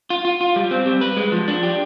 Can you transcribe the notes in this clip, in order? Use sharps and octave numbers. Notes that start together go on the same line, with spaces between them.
F4
F4
F4
G3
C4
G3
B4
G#3
F3
D4
G4